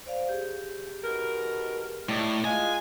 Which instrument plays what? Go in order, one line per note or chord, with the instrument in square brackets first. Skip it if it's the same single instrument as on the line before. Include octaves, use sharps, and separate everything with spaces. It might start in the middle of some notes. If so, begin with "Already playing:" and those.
[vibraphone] C5 D5 F5
G4 G#4
[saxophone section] B2 D#3 A#4
[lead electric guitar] A2 [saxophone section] A3 D#4 D5
[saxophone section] G#3 [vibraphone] F4 F5 [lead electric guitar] G#5